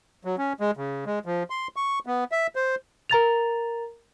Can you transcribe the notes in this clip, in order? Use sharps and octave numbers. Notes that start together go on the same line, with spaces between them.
F#3
C#4
G#3
C#3
G#3
F3
C6
C#6
B3
E5
C5
A#4 A#5 A6 F7